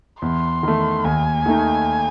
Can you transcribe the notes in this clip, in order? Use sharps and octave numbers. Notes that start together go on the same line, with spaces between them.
E2 C6
D#3 A3
D#2 G#5
D#3 A3 D#4